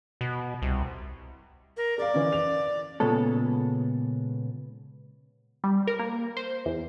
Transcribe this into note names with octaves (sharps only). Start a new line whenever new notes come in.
B2
C2
A#4
A#4 D5 F5
E3 C#4
F7
A#2 C#3 G#3 B3 A4
G3
A#4
A#3
C5
E2